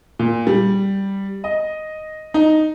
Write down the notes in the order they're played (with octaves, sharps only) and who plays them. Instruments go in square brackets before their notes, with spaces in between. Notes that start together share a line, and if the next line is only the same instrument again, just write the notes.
[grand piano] A#2
G3
D#5
D#4